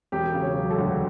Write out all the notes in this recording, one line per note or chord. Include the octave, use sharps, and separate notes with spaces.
E1 G4
C#3
C#5
F#3
A4
D2